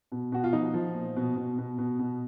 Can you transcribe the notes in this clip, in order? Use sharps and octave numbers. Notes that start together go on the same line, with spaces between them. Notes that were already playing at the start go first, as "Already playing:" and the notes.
B2
B2 F#4
F4
F3 D#4
F3
A#2
B2
B2
B2
B2
B2